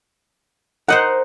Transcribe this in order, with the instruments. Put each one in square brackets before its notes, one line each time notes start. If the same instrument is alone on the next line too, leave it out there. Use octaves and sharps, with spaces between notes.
[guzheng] D#4 C5 [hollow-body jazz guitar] A#4 D#5 [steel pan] F#5